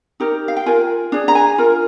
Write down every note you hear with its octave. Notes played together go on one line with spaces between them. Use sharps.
D#4 G4 A#4
F5
G5
F4 A#4 G#5
D4 G#4
A#5
G#5
F4 A#4